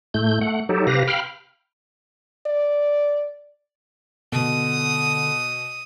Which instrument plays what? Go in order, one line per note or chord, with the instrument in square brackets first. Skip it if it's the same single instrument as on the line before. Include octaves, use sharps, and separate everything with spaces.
[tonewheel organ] A2 A3 G6
A3 F#5
F#3 D#4 G4 A4
C3 G4 B4 F5 A#6
F5 G5 B5 F6
[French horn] D5
[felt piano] B2 [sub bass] D3 [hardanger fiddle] D#6